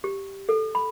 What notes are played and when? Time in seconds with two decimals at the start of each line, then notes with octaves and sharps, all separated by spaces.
0.04 G4
0.49 A4
0.75 B5